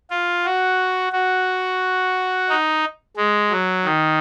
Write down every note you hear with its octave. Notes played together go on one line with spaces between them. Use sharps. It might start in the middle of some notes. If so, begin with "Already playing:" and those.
F4
F#4
F#4
D#4
G#3
F#3
D#3